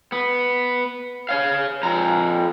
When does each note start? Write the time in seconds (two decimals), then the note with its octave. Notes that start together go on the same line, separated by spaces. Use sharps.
0.12 B3
1.29 C#5 F5
1.83 F2 A#5